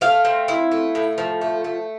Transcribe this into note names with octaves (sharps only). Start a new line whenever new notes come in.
A3 F5
C4
E4
A3
A2
F3
A3
A3